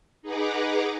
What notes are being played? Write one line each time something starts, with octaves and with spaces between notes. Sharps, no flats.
D#4 G#4 B4 F#5 A#5 D6